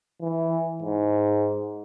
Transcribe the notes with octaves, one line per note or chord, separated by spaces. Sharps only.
E3
G#2